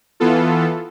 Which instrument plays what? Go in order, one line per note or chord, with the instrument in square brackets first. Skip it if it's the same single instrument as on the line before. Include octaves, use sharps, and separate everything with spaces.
[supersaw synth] E3 B3 F4 A4